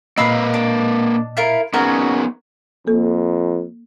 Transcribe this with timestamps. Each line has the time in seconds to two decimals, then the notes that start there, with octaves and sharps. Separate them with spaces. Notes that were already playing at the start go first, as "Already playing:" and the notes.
0.17 A#2 A#3 A#4 B4 D#5 F5 B5 E6
0.54 D4
1.37 E4 F4 A#4
1.73 B3 C#4 D#4 F#4 G#4 A#4
2.87 F2 A#3 A4